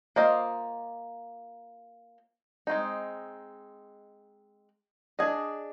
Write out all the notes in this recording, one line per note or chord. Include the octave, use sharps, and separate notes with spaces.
A#3 F4 C5 D#5
G#3 C4 D#4
D4 G#4 D#5